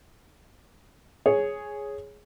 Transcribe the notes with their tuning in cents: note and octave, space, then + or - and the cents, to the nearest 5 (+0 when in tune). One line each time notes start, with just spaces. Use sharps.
G#4 +0 C#5 +0